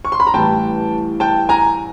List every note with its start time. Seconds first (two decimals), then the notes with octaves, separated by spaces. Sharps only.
0.05 C#6
0.12 C6
0.20 B5
0.27 A#5
0.34 A1 A2 E3 G3 G5 A5
1.20 G5 A5
1.49 G#5 A#5